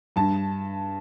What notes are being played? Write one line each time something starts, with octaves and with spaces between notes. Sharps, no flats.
G2 A5